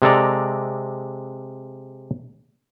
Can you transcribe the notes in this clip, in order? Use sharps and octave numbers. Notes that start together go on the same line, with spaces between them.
C3 G#3 A4 D5 A#5